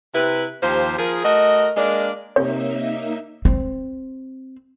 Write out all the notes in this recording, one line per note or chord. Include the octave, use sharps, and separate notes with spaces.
C3 E4 B4
D#2 F3 G4 C5
F3 G#4 A#4
A3 F#4 A#4 D#5
G#3 A#3 D4 A#4 D5 D#5
C3 A#3 D#4 C#5 E5
C4